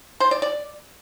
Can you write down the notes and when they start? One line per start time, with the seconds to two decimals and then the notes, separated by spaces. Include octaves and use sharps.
0.20 C5
0.31 D5
0.42 D5